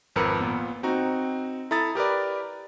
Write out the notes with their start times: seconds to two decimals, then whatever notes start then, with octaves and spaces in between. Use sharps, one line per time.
0.16 G#1 F2 A#4 B4 E6 C#7
0.41 A#2 B3
0.83 C4 D#4 F#4 A#5
1.71 E4 A4 A#5 D#6 A6
1.95 G4 A#4 B4 D5